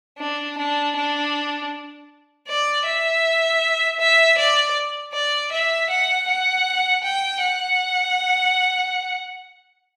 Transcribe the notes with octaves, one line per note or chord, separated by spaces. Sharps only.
D4
D4
D4
D5
E5
E5
D5
D5
E5
F#5
F#5
G5
F#5